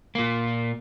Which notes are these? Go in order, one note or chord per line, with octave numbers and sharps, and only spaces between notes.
A#2 A#3